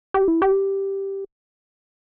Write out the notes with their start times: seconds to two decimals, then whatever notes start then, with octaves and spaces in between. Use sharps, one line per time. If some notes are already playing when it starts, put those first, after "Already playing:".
0.14 G4
0.28 E4
0.42 G4